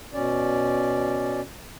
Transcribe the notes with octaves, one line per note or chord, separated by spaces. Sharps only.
B2 C#4 D5